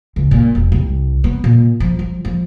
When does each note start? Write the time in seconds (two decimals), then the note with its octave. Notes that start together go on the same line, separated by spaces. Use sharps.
0.16 C#2
0.31 A#2
0.55 E1
0.72 C2
1.24 B3
1.44 A#2
1.80 F3
1.99 F3
2.25 F3